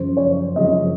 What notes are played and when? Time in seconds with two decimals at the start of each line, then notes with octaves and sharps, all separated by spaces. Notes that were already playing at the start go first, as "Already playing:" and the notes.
Already playing: F#2 C#3 F3 C5
0.17 C#5
0.56 F#2 C#3 F3 D#5